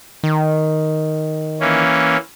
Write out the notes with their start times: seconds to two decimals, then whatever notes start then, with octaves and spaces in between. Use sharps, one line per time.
0.24 D#3
1.60 E3 A#3 C#4